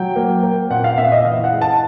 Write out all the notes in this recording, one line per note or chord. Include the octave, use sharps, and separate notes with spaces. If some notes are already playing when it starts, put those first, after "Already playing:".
Already playing: F#3 G5
A#3
A#3
A#2 F#5
F5
A#2 E5
D#5
E3 F5
F#5
G#3
A5